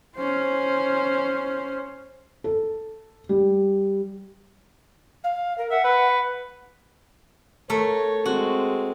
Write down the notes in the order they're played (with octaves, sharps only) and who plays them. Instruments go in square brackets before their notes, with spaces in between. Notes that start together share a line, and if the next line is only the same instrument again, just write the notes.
[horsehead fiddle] C#4 C5
[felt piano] A4
G3
[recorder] F5
A#4
[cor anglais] E5 [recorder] F#5
[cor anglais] B4
[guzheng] A3 A#4 [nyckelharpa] C#5
[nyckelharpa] G#3 C4 [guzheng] F#4